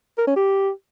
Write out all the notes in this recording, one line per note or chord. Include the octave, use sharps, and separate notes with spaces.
A#4
C#4
G4